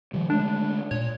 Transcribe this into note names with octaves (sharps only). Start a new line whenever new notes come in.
D#3 F3 G3
D3 G#3 A3 D4
A#2 C#5